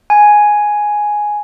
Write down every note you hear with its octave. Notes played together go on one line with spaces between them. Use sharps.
G#5